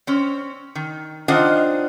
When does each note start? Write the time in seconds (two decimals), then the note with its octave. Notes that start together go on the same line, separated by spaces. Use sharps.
0.07 C4 C#4
0.75 D#3
1.28 D#3 D4 F4 C5 D#5 F#5